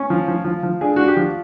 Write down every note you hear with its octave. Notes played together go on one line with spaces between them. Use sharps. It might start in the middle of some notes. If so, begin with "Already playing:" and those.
Already playing: C#4
F3
F3
F3
F3
D4 G#4
D4 F#4
G4
F3